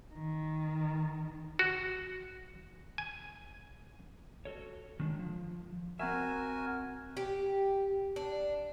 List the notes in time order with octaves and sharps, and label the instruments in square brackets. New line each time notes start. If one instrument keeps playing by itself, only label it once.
[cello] D#3
[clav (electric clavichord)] F#4
G#5
[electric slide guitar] F#4 A4 C#5
D#3 G#3 D4
F3
[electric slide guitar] C4 E5 [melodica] F#4 A#4 G#5
[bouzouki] G4
D4